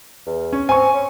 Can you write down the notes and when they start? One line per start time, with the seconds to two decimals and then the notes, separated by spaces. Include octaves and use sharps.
0.27 E2
0.53 C#4
0.69 C4 G#5 C#6
0.93 C#4